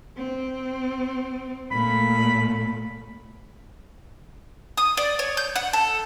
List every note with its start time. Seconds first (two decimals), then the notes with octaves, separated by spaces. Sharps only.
0.18 C4
1.71 A#2 A3 B5
4.77 D#6
4.97 D5
5.19 C#5
5.37 G6
5.56 F#5
5.73 A4